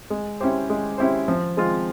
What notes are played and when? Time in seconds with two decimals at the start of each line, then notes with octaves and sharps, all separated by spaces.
0.10 G#3
0.40 C#4 E4 G4 C5
0.70 G#3
0.98 C#4 E4 G4 C5
1.28 F3
1.57 G#3 C4 F4